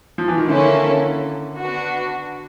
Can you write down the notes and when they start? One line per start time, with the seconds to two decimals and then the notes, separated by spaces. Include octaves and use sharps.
0.18 F3
0.28 E3
0.38 D#3
0.48 D3 A#3 C#4 E4 A4
1.60 B3 D4 F#4